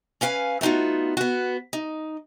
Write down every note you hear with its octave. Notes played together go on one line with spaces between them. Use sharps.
C#4 B4 F5 F#5 G#5
A3 B3 D#4 F4 F#4
B3 F#4
D#4